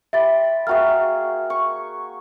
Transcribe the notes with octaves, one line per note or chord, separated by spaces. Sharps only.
G4 E5 B5 C6 A6
A#3 F#4 G#4 E5 G5 F6
C#6